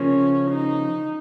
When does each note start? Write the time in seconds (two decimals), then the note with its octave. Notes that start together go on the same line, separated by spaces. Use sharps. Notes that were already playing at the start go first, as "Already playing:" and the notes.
Already playing: C#3 F3 A#3 C#4
0.51 D#4